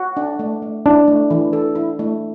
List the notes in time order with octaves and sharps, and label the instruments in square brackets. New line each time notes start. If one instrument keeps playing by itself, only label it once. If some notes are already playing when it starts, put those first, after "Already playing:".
Already playing: [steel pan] F#4
D4
A3
A3
[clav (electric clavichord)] D4 [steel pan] E4
[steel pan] A3
E3
A4
E4
A3